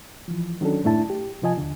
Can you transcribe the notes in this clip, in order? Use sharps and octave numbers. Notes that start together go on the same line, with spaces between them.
E3 F3
D#3 F#3 C#4 D4 A4
F#2 A2 A3 D4 E4 A5
G4
C3 F3 F4 D#5 G#5 A5
D#2 D3